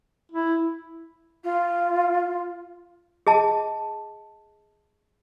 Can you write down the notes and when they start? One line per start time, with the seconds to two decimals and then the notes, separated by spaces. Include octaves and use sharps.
0.32 E4
1.44 F4
3.27 G#4 D#5 A5